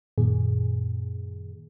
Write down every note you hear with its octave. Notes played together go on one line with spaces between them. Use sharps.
F#2 A#2 D#3 G#4